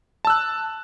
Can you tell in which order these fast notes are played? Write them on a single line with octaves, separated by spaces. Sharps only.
A5 E6 F#6